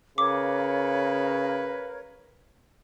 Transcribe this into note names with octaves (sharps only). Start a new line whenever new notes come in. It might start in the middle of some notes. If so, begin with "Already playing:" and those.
C#3 A#4 B4 C#5 F5 D6